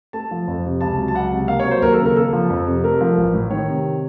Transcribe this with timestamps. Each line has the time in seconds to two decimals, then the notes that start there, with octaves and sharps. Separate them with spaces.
0.13 A3 A5
0.31 F3
0.48 F2
0.65 C3
0.81 C#2 A5
0.98 F#3
1.08 A5
1.14 C#2 F#5
1.32 C3
1.48 A#3 F5
1.60 C#5
1.65 F#3
1.71 C5
1.82 D#2 A#4
1.93 A4
1.99 C#3
2.05 A#4
2.16 A#3 A4
2.33 F3
2.50 F2
2.67 C3
2.84 A3 A#4
3.01 F3
3.18 A1
3.34 A2
3.51 D#3 C#5
3.68 C3